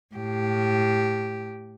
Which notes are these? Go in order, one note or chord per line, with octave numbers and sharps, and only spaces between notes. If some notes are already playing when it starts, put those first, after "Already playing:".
A2 G4